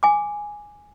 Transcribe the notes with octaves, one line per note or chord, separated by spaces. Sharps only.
G#5 D6